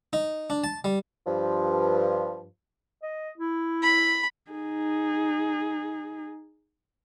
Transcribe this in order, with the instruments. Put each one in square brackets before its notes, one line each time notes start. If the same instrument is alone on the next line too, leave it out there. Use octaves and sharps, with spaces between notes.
[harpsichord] D#4
D4
A5
G3
[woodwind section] G2 F3
[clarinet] D#5
E4
[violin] B5
[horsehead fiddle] D#4 G#4